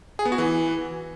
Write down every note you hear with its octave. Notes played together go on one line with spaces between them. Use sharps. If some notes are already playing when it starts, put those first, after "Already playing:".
G#4
B3
F#4
E3